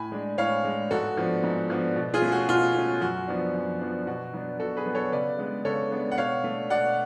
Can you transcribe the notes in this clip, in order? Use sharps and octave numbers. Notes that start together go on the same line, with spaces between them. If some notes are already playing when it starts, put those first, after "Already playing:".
Already playing: A2 G#5 B5
G#3 D4
A2 C#5 F5
G#3 D4
G#2 F#4 A4
F3 B3 D4
G#2
F3 B3 D4
B2
F4 G#4
A3 C#4
F#4
B2 F4
A3 C#4
F#2 F#4
F3 B3 D4
F#2
F3 B3 D4
B2 F#4
F#3 B3 D4
B2 F#4 A4
G#4 B4
F#3 B3 D4
A4 C#5
C#3 B4 D5
G#3 B3 D4
C#3 A4 C#5
G#3 B3 D4
F#5
B2 C#5 F5
A3 D4
B2 D5 F#5